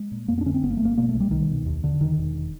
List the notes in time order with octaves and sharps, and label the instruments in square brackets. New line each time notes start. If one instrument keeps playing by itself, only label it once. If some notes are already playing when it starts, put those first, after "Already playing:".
Already playing: [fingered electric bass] G#3
A#2
F2 A#3
B3
D4
D3 C#4
C4
G1 B3
A#3
A3
G1
A#3
B2 A#3
A3
C2
G3
C2 D#3
B2
D#2
D3
E1 D#3
E1